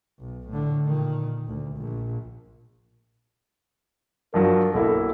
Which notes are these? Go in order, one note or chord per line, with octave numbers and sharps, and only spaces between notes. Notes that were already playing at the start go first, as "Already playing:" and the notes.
B1
A2 D3
A#2 D#3
D2
A#1
G2 F3 F#3 A#4
B1 A#3 E4 A4